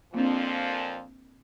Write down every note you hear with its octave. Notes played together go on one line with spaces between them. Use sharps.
F2 A#2 F3 A#3 C4 D4